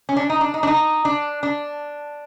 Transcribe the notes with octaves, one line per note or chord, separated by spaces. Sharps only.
C#4
D4
D#4
D4
D#4
D4
D#4
D4
D4